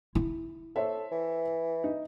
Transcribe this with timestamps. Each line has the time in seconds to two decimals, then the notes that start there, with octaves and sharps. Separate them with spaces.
0.15 E4
0.76 A4 C5 C#5 E5
1.11 E3
1.84 D#4